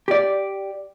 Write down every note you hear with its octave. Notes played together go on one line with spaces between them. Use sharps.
G4 D5